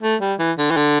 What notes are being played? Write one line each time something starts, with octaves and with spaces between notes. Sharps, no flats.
A3
G3
E3
D3
E3
D3